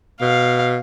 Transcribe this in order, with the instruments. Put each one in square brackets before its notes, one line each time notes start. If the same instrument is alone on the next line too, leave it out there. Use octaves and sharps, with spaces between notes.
[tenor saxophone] B2 [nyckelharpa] F5